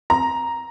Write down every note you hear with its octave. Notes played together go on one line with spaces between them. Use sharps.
A#5